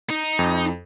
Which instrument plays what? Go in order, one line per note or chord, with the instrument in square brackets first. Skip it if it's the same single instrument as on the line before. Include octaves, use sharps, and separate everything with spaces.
[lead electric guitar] D#4
[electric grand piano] F2